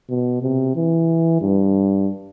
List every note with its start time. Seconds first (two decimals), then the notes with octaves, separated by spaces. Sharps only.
0.10 B2
0.43 C3
0.76 E3
1.41 G2